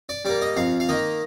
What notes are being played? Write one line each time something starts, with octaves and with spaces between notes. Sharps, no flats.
D5
G3 A#3 D5
D#5
F2 F5
F5
D#3 A#3 D#5